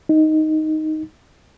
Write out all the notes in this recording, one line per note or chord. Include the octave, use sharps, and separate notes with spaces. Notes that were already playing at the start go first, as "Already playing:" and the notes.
D#4